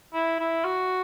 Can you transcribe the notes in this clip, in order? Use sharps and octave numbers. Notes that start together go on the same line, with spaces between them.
E4
E4
F#4